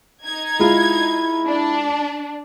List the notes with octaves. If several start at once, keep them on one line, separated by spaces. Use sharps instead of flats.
D#4 G#6
G#3 E4 F4
D4